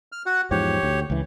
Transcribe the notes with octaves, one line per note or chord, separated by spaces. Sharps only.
F6
F#4 F#5
E2 G#2 F3 G4 C#5
D2
C#2 E3